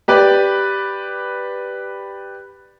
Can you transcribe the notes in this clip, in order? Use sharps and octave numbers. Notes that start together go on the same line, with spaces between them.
G4 B4 D5